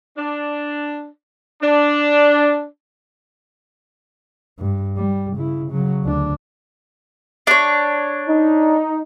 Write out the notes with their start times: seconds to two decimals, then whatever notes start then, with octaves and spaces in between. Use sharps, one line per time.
0.17 D4
1.62 D4
4.59 G2
4.97 G3
5.37 C#3 E4
5.71 C#3 F#3
6.04 D2 D4
7.47 D4 C#5
8.28 D#4